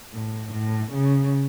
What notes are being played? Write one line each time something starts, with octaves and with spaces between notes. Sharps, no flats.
A2
A2
C#3